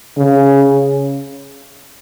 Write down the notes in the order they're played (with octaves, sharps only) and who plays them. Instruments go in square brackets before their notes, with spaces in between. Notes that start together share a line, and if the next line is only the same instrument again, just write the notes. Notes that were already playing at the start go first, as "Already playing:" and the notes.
[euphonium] C#3